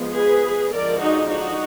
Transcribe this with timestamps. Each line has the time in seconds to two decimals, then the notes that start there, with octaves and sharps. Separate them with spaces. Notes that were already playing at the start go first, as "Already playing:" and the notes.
Already playing: F3 G#3 B3
0.14 G#4 B4
0.72 D3 F3 G#3 D4 A#4 D5
1.00 D#4 F#4
1.29 D#4 F#4